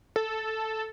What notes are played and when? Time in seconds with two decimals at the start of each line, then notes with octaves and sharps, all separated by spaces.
0.16 A4